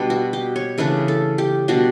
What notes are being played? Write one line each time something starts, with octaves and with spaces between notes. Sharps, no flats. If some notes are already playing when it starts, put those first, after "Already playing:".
Already playing: B2 G3 B3 D4
F#4
G4
C#5
C#3 E3 A3 D4 B4
A4
G4
B2 G3 D4 F#4